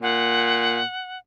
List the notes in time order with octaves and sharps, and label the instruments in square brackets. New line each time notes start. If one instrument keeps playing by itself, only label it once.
[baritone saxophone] A#2 [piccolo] F#5